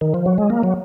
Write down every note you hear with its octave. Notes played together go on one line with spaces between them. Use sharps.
D#3
F3
F#3
G#3
A#3
F#3